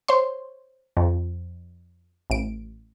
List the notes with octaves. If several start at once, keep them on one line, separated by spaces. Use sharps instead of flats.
C5 C#5 C6
F2
A1 D7